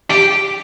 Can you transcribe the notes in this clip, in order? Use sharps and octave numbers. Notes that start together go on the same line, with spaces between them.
G4